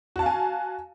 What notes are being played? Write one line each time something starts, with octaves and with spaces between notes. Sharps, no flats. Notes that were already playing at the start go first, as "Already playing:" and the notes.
F#4 F5 G#5 A5